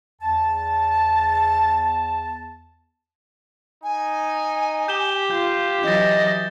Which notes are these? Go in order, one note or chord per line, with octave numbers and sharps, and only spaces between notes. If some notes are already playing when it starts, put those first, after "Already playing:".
E2 A5
D#4 G#5
G4 G6 E7 G7
F4 G6
E3 F#3 E4 D#5 G6 A6